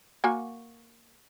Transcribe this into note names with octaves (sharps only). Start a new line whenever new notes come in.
A#3 F#4 G#5